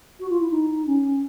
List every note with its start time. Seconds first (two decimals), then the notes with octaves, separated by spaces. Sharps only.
0.19 F#4
0.29 F4
0.40 E4
0.50 D#4
0.86 C#4